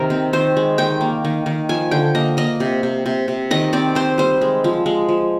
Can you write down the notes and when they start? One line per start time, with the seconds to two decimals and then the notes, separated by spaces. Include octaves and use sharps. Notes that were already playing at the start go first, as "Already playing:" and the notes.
Already playing: C3 D#3 A#4
0.10 C4
0.33 D#3 C5
0.57 G#3
0.78 D#3 G5
1.01 A#3
1.25 D#3
1.46 D#3
1.69 F3 G#5
1.91 D3 G5
2.15 A#3 D#5
2.37 A#3 D#5
2.60 C3
2.83 C3
3.06 C3
3.28 C3
3.51 D#3 D#5
3.73 C4 D5
3.95 C4 C5
4.18 G3 C5
4.41 G#3
4.64 F3
4.86 G#3
5.09 F3